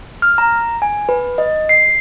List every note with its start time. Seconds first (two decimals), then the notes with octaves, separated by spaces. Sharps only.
0.22 F6
0.38 A#5
0.82 G#5
1.09 B4
1.38 D#5
1.69 C7